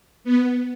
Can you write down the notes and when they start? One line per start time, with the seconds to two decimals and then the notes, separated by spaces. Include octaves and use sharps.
0.24 B3